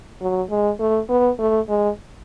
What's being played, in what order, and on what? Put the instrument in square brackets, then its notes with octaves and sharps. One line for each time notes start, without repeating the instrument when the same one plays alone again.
[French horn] F#3
G#3
A3
B3
A3
G#3